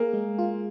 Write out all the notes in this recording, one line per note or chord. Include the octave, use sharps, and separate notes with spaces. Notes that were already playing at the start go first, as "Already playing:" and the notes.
Already playing: A#3 G#4
G#3
F4